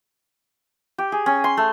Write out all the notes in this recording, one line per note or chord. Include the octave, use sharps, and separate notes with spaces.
G4
G#4
C#4
C6
A3